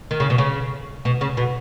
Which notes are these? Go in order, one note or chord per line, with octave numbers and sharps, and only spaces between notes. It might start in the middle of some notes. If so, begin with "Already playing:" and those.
D#3
C#3
B2
C#3
B2
C#3
B2